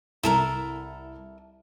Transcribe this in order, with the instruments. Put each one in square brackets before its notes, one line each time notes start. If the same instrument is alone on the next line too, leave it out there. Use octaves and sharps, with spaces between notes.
[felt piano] C2 [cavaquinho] E4 A4 A#4